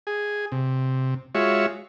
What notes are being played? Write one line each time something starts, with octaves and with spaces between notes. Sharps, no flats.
G#4
C3
G#3 F4 F#4 C#5 E5